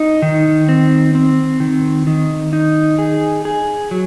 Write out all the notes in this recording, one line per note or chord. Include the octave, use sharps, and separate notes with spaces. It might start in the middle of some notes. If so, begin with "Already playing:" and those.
Already playing: D#4
D#3
C4
C4
D#3
D#3
D#4
G#4
G#4
F#3